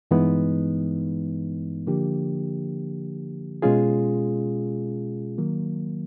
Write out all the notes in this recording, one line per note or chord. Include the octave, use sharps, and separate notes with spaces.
G2 E3 G#3 B3 D#4
D3 F3 A#3 D4 G4
B2 G#3 C#4 F4 G#4
D#3 F#3 A#3